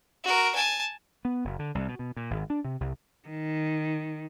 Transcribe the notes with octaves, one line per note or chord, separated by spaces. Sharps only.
F#4 A#4
G#5 A5
B3
F#1
D3
C2
B2
B2
A#2
G#1
D4
C3
C2
D#3